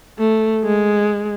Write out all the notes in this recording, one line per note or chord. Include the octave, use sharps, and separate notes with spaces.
A3
G#3